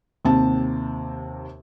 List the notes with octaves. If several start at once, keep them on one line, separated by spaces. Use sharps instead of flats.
D#2 C3 C4 A5